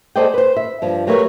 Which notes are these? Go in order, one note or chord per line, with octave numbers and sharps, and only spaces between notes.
G#4 A4 C5 D5 D#5 G5
B4 C5
E5
G2 F3
F#3 A3 G4 A#4 B4 C#5